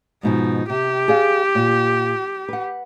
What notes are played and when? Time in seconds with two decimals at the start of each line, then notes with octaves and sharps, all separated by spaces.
0.23 G#2 B2 F3 D#4
0.70 C3 G4
1.08 G#4 D5 F5
1.55 A#2
2.49 B4 F#5